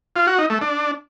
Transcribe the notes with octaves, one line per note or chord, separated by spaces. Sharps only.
F4
F#4
D#4
A3
D4